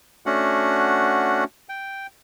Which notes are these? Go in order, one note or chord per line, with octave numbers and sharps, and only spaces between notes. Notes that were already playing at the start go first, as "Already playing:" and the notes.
A3 C#4 D4 F#4 F#5
G5